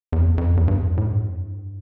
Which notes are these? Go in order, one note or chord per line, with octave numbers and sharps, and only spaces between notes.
E2
F2
F2
E2
G2
F2
A2
G2
F2
G2